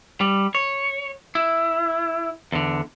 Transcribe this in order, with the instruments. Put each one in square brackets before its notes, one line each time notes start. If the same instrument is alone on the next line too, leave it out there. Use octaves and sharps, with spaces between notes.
[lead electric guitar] G3
C#5
E4
E2 D3